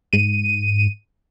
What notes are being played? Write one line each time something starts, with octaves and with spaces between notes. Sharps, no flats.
G#2 D#7